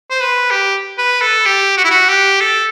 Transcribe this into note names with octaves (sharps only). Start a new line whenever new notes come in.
C5
B4
G4
B4
A4
G4
F#4
E4
F#4
G4
A4